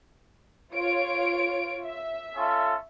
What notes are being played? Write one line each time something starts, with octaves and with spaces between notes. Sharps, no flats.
F4 C#5 D7
E5
C#4 F4 A4